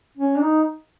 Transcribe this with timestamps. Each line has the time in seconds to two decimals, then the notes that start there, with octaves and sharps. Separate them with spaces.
0.17 C#4
0.36 D4
0.41 D#4